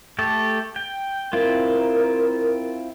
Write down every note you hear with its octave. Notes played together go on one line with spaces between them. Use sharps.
A3 G4 A4
G5
C4 E4 F4 A#4